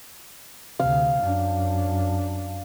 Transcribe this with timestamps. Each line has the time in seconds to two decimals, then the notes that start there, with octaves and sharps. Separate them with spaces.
0.80 D2 C3 F5
1.20 F#2 D4